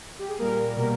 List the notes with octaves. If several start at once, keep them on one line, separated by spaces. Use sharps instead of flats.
G4
G#4
A#2 G3 A#3 A#4
B2 G3 A#3